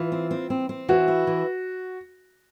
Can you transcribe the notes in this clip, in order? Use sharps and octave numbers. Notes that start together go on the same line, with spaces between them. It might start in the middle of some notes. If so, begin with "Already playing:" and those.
Already playing: E3 F4
C4
C4
C4
C4
E3 F#4
E4
E3